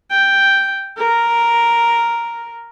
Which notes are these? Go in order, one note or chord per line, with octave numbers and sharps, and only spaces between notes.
G5
A#4